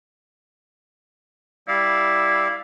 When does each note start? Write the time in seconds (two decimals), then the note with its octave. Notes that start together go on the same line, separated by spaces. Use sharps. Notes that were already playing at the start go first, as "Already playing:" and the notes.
1.68 G3 E4 D5 F5